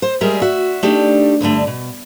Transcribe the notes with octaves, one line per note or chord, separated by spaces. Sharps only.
C5
G3 G#3 G#4 A#4 E5
F#4 E5
A3 D4 D#4 G4
D2 G2 D3 A3
B2